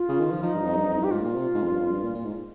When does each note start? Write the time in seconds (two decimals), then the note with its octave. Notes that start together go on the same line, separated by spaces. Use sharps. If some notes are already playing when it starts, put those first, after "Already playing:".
Already playing: F4
0.09 C#3
0.20 D#3
0.31 F3
0.43 F3 D#4
0.54 G2
0.65 F2
0.77 G2
0.89 F2
1.00 G2 G4
1.11 G#2 F4
1.23 A#2
1.35 C3
1.54 G#2
1.63 F2
1.71 G2
1.80 F2
1.91 G2
2.03 A#2
2.15 A#2
2.25 G#2